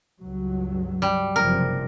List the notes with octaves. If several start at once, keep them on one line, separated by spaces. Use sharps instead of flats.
C#2 G2 F#3
G3
F#1 C3 F3 A#4